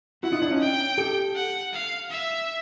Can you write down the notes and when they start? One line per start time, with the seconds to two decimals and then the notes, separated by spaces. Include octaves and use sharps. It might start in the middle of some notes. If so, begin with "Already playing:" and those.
0.23 E4 F#4 F#5
0.32 D#4 F4
0.42 D4 E4
0.51 C#4 D#4
0.60 G5
0.98 G4 A4
1.35 F#5
1.73 F5
2.10 E5